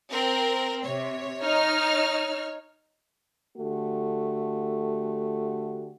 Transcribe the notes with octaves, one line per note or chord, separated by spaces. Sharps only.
C4 A#4
C3 C#5
D#4 F6
D3 A3 F#4 G4